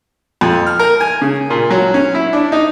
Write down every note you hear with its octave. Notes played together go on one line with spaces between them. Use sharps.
F2
F6
A#4
G#5
C#3
A#2
F#3
C#4
E4
D4
D#4